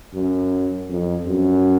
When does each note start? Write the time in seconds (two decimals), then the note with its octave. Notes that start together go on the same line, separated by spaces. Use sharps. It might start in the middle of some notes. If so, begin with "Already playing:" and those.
0.14 F#2
0.89 F2
1.27 F#2